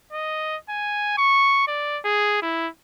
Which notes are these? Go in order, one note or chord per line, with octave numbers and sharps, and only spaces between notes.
D#5
G#5
C#6
D5
G#4
E4